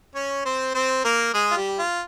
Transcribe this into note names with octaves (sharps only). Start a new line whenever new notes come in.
C#4 C#5
C4 C5
C4 C5
A#3 A#4
G#3 G#4
F4
G3 G4
F4